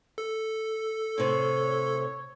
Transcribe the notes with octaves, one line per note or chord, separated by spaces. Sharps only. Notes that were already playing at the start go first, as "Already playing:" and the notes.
A4
A2 C3 C#5